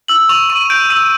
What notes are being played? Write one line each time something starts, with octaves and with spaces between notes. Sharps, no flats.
E6 F#7
C#6 F7
C#6 D#7
G6 D7
E6 D#7